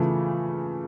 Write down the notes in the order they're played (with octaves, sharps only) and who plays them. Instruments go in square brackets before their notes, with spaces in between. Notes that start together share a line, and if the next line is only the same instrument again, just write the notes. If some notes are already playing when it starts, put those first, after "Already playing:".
Already playing: [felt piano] C#3 E3 A3 [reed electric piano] F4